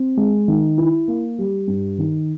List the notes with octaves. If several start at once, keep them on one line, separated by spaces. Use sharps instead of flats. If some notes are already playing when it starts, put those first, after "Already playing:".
Already playing: C4
G#3
D#3
E4
A#3
G3
G2
D#3